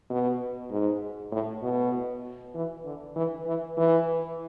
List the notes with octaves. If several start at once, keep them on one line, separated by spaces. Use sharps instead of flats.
B2
G#2
A2
B2
E3
D3
E3
E3
E3